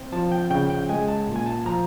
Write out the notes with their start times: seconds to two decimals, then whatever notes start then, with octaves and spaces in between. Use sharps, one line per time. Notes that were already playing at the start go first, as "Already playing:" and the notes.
Already playing: C4
0.12 F3 A5
0.32 G5
0.50 C#3 G5
0.70 G5
0.89 G#3 G#5
1.08 A5
1.28 A#2
1.36 G#5
1.46 A5
1.66 F3 A#5